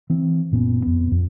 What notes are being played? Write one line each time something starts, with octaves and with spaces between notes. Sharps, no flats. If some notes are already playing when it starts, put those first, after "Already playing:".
E3 C4
F#1 A#2 B3 C#4
F2 B3
F2